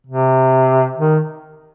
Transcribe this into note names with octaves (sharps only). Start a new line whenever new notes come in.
C3
D#3